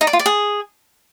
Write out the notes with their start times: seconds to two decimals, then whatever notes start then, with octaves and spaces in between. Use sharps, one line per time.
0.01 D#4
0.07 D5
0.13 F4
0.19 D5
0.26 G#4